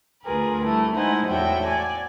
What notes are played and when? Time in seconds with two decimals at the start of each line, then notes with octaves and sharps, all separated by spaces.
0.23 D2 F4 G#4 A#4 B4
0.65 G3 A3 E4
0.96 G#3 D#4 E4 C5 F#5 G#5
1.28 E2 A2 F#4 E5 G5
1.67 D5 G#5